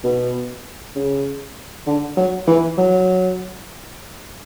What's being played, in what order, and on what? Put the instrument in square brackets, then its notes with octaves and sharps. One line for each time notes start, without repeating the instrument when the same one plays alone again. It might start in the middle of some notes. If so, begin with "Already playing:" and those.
[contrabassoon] B2
C#3
D3
F#3
E3
F#3